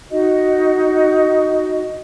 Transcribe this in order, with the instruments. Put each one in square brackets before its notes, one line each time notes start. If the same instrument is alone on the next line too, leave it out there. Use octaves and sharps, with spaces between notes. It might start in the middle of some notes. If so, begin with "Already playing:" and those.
[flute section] D#4 F#4 D#5